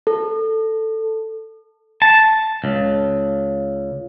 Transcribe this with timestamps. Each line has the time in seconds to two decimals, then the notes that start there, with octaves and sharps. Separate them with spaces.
0.07 A4
2.02 A5
2.64 C#2